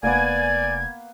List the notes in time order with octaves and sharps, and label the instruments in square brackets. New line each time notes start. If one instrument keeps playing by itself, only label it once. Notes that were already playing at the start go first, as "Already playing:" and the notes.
[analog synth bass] F1 [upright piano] A#3 B3 [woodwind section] D5 G#5 [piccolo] G#6